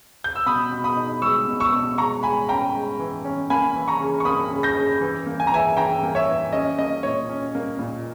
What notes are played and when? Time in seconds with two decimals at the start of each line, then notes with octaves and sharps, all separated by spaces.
0.24 G6
0.35 E6
0.46 B2 B5 D#6
0.72 B2
0.84 B5 D#6
0.97 D#4
1.22 G#3 C#6 E6
1.47 B2
1.60 C#6 E6
1.72 B2
1.98 G#3 A#5 C#6
2.23 G#3 G#5 B5
2.49 C#4 G5 A#5
2.73 G#3
2.99 E3
3.25 C#4
3.50 A#3 G#5 B5
3.75 E3
3.88 A#5 C#6
4.00 C#3
4.20 C#6
4.25 A#3 B5 D#6
4.51 C#3
4.63 G6 A#6
4.77 C#3
5.01 E3
5.27 A#3
5.40 G#5
5.47 A#5
5.52 E3 E5 G#5
5.77 E3 G5 A#5
6.03 A#3
6.15 C#5 E5
6.28 E3
6.53 C#4 D#5
6.78 A#3 D#5
7.03 A#2 C#5
7.29 C#4
7.55 A#3
7.79 A#2